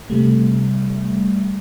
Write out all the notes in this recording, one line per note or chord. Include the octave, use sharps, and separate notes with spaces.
C3 G3 A3